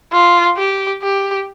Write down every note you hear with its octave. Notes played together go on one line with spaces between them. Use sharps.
F4
G4
G4